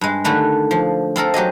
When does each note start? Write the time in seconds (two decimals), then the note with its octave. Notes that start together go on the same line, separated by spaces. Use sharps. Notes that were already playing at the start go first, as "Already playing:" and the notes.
0.01 G2 G#3
0.24 D3 D#3 A3 B4
0.71 F3
1.16 C4 F4 A4 A#4
1.34 F#3 G4 G#4 D#5